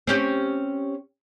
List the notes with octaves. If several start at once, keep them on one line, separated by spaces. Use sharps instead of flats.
C4 C#4 G4